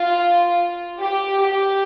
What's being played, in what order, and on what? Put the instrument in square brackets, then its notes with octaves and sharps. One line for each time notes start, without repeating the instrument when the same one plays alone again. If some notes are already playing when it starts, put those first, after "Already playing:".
Already playing: [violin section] F4
G4
G4